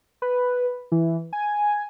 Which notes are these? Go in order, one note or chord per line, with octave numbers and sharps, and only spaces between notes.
B4
E3
G#5